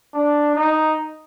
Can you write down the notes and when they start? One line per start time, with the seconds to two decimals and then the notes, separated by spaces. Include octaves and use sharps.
0.13 D4
0.55 D#4